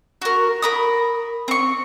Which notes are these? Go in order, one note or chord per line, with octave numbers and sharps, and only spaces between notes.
F#4 A#4
A#4 B5 D#6
C4 C#6